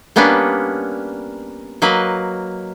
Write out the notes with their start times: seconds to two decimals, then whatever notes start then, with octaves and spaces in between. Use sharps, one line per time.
0.16 G3 A#3 B3 C#4 D4 B4
1.82 F#3 A#3 B4 D#5